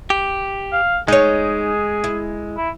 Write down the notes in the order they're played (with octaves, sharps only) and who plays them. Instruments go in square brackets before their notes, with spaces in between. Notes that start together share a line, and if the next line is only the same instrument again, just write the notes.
[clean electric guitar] G4
[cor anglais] F5
[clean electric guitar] G#3 [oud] D#4 C#5 [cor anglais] G#4
[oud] E4
[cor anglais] E4